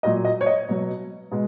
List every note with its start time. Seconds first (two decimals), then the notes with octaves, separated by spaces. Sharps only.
0.03 A#2 F#3 D#5
0.25 D#5
0.41 C#5
0.46 D#5
0.68 B2 F#3
1.31 B2 G#3